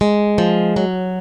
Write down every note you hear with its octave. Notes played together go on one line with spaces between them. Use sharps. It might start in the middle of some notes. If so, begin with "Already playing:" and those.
G#3
F3
F#3